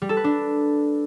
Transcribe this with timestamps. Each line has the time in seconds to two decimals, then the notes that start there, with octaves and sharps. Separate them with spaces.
0.02 G3
0.09 A4
0.17 B4
0.24 D4